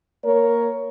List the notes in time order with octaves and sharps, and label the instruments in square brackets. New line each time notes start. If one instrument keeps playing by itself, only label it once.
[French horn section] A#3 A#4 C#5